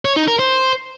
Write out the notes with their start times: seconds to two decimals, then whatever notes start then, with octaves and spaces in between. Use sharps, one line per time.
0.05 C#5
0.16 D#4
0.28 A#4
0.39 C5